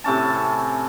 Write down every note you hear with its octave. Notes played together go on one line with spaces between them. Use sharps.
A2 C3 C#4 A5